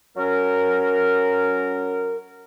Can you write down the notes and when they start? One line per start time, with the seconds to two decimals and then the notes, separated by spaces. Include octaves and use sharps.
0.17 F#3 C#4 A#4